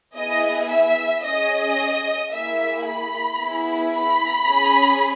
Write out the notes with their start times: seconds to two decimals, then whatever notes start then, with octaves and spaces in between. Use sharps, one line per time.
0.16 B3 E4 G#4 D#5
0.70 E5
1.24 C#4 G#4 D#5
2.31 A#3 E4 G#4 E5
2.85 B5
3.39 B3 E4 G#4
3.93 B5
4.48 C#4 G#4